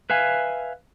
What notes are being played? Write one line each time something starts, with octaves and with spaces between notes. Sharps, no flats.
B4 E5 F5 G#5